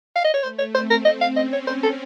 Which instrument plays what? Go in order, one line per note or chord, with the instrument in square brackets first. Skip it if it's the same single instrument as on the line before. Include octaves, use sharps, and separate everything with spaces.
[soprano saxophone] F5
D#5
C#5
[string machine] A3 [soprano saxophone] C5
[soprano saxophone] C#5
[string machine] C4 [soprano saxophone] C5
[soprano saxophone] A#4
D#5
F5
[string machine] C#4 [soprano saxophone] D#5
[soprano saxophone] C#5
C5
A4